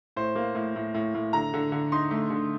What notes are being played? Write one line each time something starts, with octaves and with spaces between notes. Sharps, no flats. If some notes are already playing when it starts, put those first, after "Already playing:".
A2 C5
A#3
A2
A2
A2
A2
D3 A#5
D3
D3
D#4 C6
A3
D3